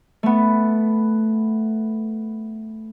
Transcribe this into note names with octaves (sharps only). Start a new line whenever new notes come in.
A3 B3